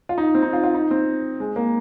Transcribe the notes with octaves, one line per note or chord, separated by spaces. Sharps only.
F4
D#4
C4
D#4
F4
F4
D#4
C4
G#3
A#3